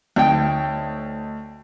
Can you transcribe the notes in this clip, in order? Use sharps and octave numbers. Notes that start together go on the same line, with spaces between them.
D2 D#4 C#5 G5